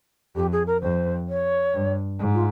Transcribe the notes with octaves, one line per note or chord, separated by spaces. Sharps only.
F2 G4
G#4
A#4
F2 C5
C#5
G2
G#2
F4